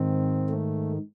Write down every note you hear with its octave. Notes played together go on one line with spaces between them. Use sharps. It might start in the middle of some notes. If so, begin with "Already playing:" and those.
Already playing: G#2 D#3 C4
A3